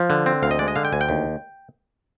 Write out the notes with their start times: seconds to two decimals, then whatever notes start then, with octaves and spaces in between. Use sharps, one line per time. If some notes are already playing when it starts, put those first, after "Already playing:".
Already playing: F3
0.10 D3
0.26 C4
0.43 D2 F5
0.51 D#5
0.59 G#3 D5
0.68 D#5
0.76 D3 F5
0.85 G5
0.92 D2 G#5
1.01 G5
1.09 D#2